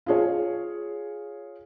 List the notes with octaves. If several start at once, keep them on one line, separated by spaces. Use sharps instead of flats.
F4 G#4 C#5